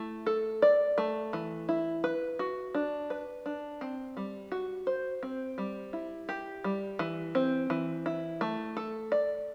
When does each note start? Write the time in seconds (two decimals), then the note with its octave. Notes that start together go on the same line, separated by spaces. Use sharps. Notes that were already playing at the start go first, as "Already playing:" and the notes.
Already playing: A3 E4
0.26 A4
0.62 D5
0.98 A3
1.33 E3
1.69 E4
2.04 B4
2.39 F#4
2.75 D4
3.10 B4
3.46 D4
3.81 C4
4.17 G3
4.52 F#4
4.87 C5
5.23 C4
5.58 G3
5.93 E4
6.29 G4
6.64 G3
6.99 E3
7.35 C4
7.70 E3
8.06 E4
8.41 A3
8.77 A4
9.12 D5